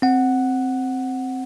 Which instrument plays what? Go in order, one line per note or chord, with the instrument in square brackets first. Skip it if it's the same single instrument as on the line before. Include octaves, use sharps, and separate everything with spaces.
[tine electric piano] C4 F#5